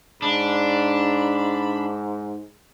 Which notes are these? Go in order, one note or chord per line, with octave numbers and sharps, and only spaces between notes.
G#2 D4 B5